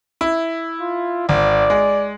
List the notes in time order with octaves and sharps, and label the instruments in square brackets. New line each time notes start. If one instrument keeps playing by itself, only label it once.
[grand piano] E4
[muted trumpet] F4
[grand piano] G#1 [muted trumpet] D5
[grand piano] G#3